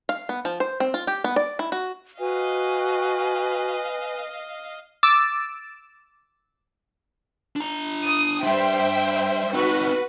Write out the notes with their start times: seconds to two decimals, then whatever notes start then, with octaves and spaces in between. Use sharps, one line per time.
0.09 F5
0.29 B3
0.45 F3
0.60 C5
0.80 C4
0.94 F4
1.07 G4
1.24 B3
1.36 D5
1.59 E4
1.72 F#4
2.19 F#4 B4 D#5 F5 G#5
5.03 D6 E6 A6
7.56 D4 A#5
8.05 D#6
8.43 G3 D4 C5 E5 G5
9.54 C4 D#4 F#4 B4